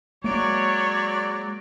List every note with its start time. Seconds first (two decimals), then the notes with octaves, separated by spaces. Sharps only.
0.24 F#3 G#3 A#3 C#5 D5 D7